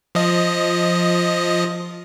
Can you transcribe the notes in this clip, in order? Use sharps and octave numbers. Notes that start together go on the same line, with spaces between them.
F3 D#5